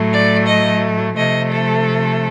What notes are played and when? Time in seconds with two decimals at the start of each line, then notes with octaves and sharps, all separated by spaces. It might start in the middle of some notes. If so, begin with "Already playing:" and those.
Already playing: A2 F#3 A3
0.12 D5
0.47 D#5
1.16 C3 F3 A3 D#5
1.52 A4